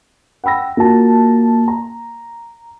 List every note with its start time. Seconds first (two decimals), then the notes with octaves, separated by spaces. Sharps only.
0.44 F#5 G5 B5 E6 A#6
0.77 A#3 F4 F#4 A5
1.68 A#5